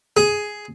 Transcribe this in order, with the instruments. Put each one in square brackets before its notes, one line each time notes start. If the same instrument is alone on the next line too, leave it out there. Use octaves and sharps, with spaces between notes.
[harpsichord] G#4